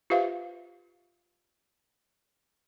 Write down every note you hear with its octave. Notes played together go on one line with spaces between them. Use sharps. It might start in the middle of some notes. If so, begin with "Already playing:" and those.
F4 G4 B4 C5 E5 F5